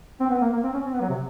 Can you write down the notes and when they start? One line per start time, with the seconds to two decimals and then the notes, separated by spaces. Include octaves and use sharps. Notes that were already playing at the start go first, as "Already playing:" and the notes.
0.20 C4
0.30 B3
0.42 A#3
0.53 A#3
0.63 C4
0.73 C#4
0.85 C4
0.93 B3
1.01 F#3
1.09 C3